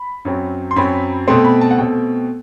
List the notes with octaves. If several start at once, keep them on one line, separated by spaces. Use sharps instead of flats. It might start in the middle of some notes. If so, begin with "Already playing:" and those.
Already playing: B5
F#2 F#3 C4
C6
F#2 F#3 C4 B5
B2 A3 C4 C6
B5
A5
F#5
B2 A3 C4 G5